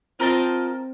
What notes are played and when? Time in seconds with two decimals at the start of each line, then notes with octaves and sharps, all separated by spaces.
0.20 C4 F4 A#4 D#5 A5